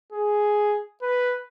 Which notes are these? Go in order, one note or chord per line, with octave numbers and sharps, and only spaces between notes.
G#4
B4